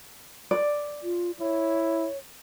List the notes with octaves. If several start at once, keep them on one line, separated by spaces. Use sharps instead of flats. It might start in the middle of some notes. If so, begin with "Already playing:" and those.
D5
F4
E4 C#5